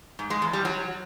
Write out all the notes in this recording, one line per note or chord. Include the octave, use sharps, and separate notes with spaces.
G#2
G#3
E2
G3
F#3